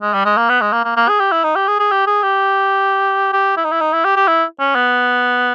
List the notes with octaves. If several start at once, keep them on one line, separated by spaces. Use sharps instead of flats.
G#3
G3
G#3
A#3
B3
G#3
A#3
A#3
A#3
G#4
G4
E4
D#4
G4
G#4
G#4
G4
G#4
G4
G4
E4
D#4
E4
D#4
E4
G4
G4
E4
C#4
B3